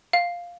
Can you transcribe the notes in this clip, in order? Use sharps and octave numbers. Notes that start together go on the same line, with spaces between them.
F5